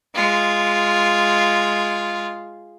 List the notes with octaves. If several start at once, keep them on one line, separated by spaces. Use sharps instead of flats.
G#3 F4